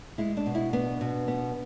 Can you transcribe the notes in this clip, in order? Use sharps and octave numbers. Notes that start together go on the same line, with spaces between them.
G#3 E4
D4
B2
E4
B3 D4
B2
B3